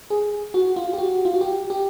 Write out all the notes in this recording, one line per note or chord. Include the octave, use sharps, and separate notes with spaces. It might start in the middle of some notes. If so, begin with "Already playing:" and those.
G#4
F#4
F4
G4
F#4
F4
F#4
G4
G4